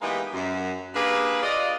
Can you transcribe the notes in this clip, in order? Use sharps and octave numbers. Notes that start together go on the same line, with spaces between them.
E3 G#3 A#3 B3 D#4 G4
F#2
A#3 D4 G4 G#4 B4
F4 D5 D#5